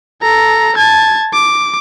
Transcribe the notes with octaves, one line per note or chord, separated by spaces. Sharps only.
A4 A#5
A5 G#6
D6